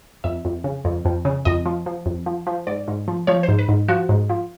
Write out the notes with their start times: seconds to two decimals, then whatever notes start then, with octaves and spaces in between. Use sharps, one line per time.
0.24 F2 E5
0.45 F2
0.64 C#3
0.85 F2
1.05 F2
1.25 C#3
1.45 F2 D#5
1.66 F3
1.86 F3
2.06 F2
2.26 F3
2.47 F3
2.67 G#2 D5
2.88 G#2
3.08 F3
3.27 F3 C#5
3.43 C5
3.48 G#2
3.59 B4
3.69 G#2
3.88 F3 F#4
4.09 G#2
4.30 F3